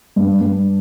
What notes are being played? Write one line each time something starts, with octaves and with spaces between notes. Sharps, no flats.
G2
G2